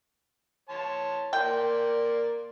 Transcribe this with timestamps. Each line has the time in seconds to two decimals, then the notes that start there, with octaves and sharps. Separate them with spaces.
0.69 C#5 A5 C6
1.33 A#3 D5 G5 C6